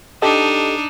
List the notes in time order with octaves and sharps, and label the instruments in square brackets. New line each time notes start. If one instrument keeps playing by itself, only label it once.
[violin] D4 D#4 [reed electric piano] G4 A4 D#5